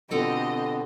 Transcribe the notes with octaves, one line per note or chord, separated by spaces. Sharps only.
B2 D3 C4 F4 G4 A4 D#5 G5